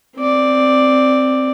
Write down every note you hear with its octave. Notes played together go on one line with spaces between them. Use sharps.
C4 D5